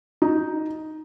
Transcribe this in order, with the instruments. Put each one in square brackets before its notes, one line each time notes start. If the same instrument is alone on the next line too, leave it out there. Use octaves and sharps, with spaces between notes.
[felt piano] D#4